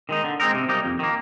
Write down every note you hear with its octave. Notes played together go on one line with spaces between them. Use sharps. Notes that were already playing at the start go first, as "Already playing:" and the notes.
D#3 G#3 D#4
D3
G#3 C4 D#4 A#4
C3
G3 A#3 D#4
F2
D#3 A#3